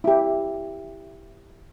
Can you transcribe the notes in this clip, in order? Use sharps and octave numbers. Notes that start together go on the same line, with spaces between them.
E4 G4